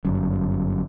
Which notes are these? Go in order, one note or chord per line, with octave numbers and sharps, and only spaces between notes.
G1 F#2